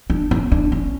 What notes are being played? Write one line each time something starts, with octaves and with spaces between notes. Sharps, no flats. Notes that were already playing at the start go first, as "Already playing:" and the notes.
D4
C#4
D4
C#4